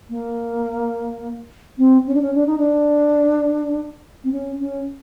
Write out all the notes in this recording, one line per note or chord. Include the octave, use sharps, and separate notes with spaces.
A#3
C4
C#4
D4
C#4
D4
D#4
D4
C4
C#4
C#4